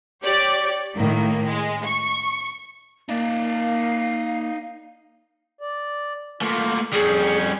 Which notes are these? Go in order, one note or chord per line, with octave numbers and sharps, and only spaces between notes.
G4 C#5 D5
A2 D#3 A#3
G#3
C#6
A#3 D#4 D5 F5
D5
A3 A#3 F4
F2 G3 C#4 G#4 G5